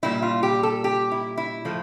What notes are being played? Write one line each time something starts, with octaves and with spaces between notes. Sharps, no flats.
A#2 G3 E4
F4
G4
A4
G4
E4
E4
A2 F3 A3